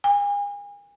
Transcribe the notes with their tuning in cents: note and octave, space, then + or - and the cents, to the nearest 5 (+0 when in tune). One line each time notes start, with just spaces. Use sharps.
G#5 -40